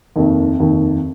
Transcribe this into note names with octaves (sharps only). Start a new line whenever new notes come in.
F1 D#2 D#3
F1 D#2 D#3